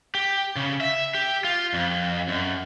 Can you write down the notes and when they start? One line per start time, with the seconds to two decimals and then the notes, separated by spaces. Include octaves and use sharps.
0.15 G4
0.56 C#3
0.81 E5
1.15 G4
1.44 F4
1.74 F2
2.28 F#2